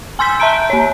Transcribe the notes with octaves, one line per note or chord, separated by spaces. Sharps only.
G#5 C6 E6 G6 B6
E5 A5 A#5 G6 D7
A#3 C#5